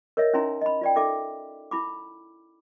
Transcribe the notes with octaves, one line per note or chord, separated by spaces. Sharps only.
A#4 C#5 D#5 E5
C#4 D#4 E4 G#5 A#5 C6
D#5 B5
F4 D5 G5
D#4 A4 E5 D6
E4 B5 D6